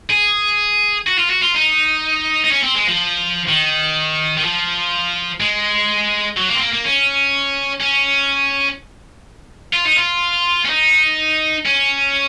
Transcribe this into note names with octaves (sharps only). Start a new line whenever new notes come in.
G#4
F#4
F4
F#4
F4
D#4
D#4
C#4
C4
G#3
F3
D#3
D#3
F3
G#3
F#3
A#3
C4
A#3
A#3
C#4
C#4
F4
D#4
F4
C#4
D#4
C#4